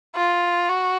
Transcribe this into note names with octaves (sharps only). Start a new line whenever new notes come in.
F4
F#4